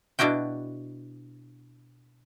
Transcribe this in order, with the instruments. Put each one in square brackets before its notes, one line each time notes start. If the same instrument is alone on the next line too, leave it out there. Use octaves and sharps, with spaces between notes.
[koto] B2 D4 E4 F#4 G5